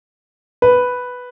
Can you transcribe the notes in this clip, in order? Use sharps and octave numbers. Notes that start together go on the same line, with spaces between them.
B4